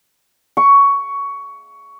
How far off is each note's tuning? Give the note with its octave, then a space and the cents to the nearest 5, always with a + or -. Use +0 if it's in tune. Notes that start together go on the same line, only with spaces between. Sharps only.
C#6 +15